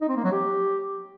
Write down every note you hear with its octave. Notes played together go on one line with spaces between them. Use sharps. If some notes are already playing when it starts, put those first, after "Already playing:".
D#4
C4
A#3
F#3
G4